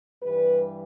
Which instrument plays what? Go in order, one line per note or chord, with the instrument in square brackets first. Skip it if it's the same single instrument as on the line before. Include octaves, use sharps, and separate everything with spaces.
[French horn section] G2 E3 G3 B4